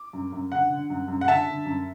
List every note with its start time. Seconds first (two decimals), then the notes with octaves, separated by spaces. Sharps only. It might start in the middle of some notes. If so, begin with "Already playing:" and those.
Already playing: D6
0.13 F#2
0.32 F#2
0.52 D3 F#5
0.70 D3
0.90 F#2
1.08 F#2
1.21 F#5
1.28 D3 E5 A5
1.47 D3
1.66 F#2